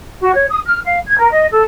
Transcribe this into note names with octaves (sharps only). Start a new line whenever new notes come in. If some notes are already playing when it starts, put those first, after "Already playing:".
F#4
C#5
D#6
F6
F5
G#6
A#4
D#5
A4